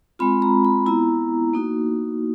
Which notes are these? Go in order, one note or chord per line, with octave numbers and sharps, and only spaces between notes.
G#3 C4 F4 B5
A#5
B5
B3 E4 A#5
A#3 D#4 F#4